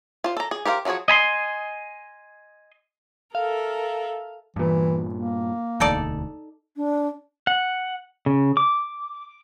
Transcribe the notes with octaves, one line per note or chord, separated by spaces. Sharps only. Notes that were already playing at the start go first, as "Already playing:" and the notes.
F4 C5
A4 A#5
G#4
G4 A#4 C5 F5
F3 F#3 F#4 G#4 C#5
D#5 G#5 B5 C6
A4 A#4 E5 F5
G2 A#2 E3
A#3
E1 D2 D#4 A4 D5
D4
F#5
C#3
D6